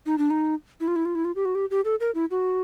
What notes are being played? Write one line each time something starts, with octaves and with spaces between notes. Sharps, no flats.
D#4
D4
D#4
E4
F4
E4
F4
E4
F4
G4
F#4
G4
G4
A4
A#4
E4
F#4